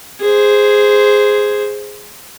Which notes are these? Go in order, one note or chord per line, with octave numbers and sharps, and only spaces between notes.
G#4 C5